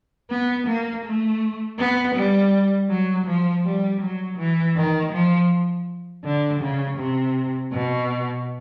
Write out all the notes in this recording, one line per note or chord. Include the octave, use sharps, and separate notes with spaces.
B3
A#3
A3
B3
G3
F#3
F3
G3
F#3
E3
D#3
F3
D3
C#3
C3
B2